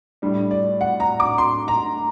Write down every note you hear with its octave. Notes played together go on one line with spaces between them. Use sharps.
A2 G3 D4
D5
F#5
A#5
D6
C6
A#5